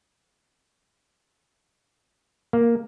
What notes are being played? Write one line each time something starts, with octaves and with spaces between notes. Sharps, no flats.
A#3